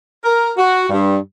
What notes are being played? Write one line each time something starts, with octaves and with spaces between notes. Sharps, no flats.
A#4
F#4
G2